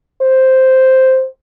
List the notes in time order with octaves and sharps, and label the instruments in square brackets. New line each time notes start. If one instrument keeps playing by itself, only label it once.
[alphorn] C5